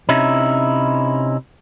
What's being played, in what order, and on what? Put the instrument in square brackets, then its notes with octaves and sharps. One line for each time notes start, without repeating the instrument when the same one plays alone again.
[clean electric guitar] C3 C#4 D#4 E4